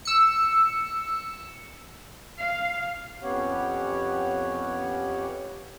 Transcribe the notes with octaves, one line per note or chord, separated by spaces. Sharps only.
E6 C#7
F5
F2 B3 C#4 G4 C#5 F#5